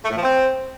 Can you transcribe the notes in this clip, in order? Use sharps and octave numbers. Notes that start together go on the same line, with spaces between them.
A3
A2
F3
C4